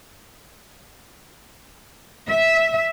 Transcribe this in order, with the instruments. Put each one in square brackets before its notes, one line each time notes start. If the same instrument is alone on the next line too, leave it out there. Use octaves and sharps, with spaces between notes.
[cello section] E5